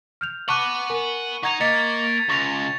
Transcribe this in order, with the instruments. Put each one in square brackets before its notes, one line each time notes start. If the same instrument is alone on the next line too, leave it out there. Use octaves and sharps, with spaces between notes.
[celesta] F6 G6 F7
[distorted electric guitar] F#5 B5 [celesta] A5 D6 F#6 [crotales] C#6 D#7
[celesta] A#4 G#5
[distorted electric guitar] D#4 [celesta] F#5 A#5 [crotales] C#6 G#6 F7
[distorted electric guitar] A#3 [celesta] D#5 [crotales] A6 B6 C#7
[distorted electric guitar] C#2 [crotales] C#6 F7 [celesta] A#6